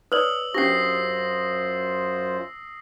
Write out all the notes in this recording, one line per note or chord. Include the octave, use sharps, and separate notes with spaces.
B4 C#5 D5 D#6 E6 F#7
F#2 C#4 D4 F4 G4 C5 A#6 C7